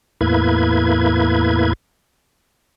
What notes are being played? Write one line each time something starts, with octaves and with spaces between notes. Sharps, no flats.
E2 A2 A#3 E4 B4 G#6